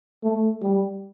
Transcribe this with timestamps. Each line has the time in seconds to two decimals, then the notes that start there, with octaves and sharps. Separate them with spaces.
0.24 A3
0.62 G3